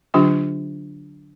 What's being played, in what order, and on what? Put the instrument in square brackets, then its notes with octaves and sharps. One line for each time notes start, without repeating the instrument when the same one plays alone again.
[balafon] D3 F#3 D4 F4 G4 G5